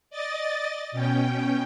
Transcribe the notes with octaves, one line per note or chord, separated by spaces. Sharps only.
D5 D#5 A6
B2 C#4 G5